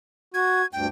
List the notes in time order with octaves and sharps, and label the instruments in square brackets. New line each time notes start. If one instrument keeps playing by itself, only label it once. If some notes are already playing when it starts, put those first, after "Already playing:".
[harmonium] F#4 [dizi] G#6
[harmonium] D2 G2 [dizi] G5